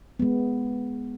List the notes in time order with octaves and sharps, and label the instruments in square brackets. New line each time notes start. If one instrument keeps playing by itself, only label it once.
[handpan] G#3 B3